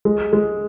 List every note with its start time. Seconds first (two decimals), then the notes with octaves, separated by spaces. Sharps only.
0.05 G#3
0.33 G#3